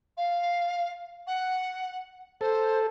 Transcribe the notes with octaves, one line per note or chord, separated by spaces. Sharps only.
F5
F#5
A4 C5